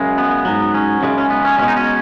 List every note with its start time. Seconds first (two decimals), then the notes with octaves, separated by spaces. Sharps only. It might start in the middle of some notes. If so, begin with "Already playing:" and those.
Already playing: F#2 C#3 G#3
0.18 B3
0.45 G#2 F#3
0.74 C#4
1.02 F#2 C#3 G#3
1.18 C#4
1.30 B3
1.45 C#4
1.58 B2 G#3 C#4
1.68 D#4
1.77 C#4